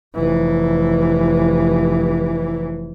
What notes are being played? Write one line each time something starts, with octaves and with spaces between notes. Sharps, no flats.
F1 E3